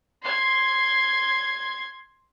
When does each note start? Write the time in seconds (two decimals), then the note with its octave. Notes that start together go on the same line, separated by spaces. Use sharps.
0.23 C6 G#6